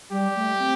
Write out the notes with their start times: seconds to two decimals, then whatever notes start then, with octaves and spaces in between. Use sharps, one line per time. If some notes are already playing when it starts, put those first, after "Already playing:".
0.11 G3 G4
0.36 A3
0.59 C4